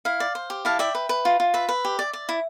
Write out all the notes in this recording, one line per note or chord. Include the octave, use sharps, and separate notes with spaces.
E4 F5
D5
C5
G4
E4 F5 A5
D5 E5 G5
B4
B4
F4
F4
B4 E5
B4
G4
D5
D5
E4